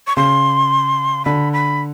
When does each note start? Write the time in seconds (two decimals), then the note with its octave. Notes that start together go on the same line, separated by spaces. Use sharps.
0.07 C#6
0.16 C#3 C6
1.25 D3 B5
1.53 B5